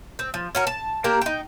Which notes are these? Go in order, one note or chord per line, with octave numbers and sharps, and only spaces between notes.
C4
F3
C#4 F#4 A#4
A5
A#3 D4 G4 A#4
D#4 G5